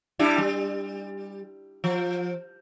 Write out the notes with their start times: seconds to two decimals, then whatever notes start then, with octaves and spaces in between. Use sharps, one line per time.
0.19 G3 D4 E4
0.38 G3
1.84 F3